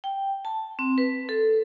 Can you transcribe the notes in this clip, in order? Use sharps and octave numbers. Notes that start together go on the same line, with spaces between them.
G5
A5
C4
B4
A4